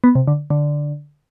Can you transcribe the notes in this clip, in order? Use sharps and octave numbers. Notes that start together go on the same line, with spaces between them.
B3
C3
D3
D3